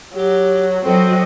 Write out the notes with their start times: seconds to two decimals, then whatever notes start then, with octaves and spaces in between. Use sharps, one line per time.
0.15 F#3 G4
0.85 F#3 C4 F#4 A4 D#5